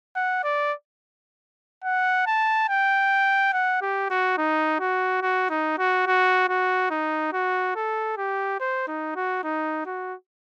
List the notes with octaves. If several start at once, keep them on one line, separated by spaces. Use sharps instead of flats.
F#5
D5
F#5
A5
G5
F#5
G4
F#4
D#4
F#4
F#4
D#4
F#4
F#4
F#4
D#4
F#4
A4
G4
C5
D#4
F#4
D#4
F#4